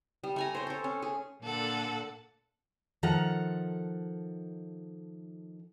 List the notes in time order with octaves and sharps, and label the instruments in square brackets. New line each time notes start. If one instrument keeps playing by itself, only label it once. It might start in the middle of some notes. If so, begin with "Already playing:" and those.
[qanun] G3
A3 G#5 A#5
C5 C#5
A4 C#5
C#4
G#4
[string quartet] A#2 D3 A4 F#5
[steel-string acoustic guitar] D#3 F3 A4 F#5 A#5